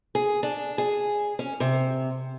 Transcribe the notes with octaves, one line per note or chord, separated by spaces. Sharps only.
G#4
D4
G#4
C#4
C3